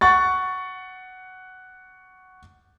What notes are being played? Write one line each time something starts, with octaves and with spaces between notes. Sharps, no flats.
F#5 C#6 A6